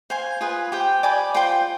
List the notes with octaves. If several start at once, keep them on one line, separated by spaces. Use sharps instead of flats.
C5 F5 G#5 C6
F4 G#4 B4
G4 C5 G5
D5 G#5 B5 D6
F4 C5 G5 C6